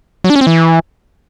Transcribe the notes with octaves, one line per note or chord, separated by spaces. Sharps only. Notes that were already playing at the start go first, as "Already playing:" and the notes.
F#3
D4
C#4
C4
E3